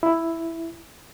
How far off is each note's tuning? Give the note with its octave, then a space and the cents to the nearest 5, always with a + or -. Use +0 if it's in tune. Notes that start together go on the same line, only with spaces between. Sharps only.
E4 +5